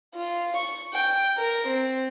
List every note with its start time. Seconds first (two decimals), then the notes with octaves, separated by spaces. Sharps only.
0.15 F4
0.56 C#6
0.93 G5
1.37 A#4
1.67 C4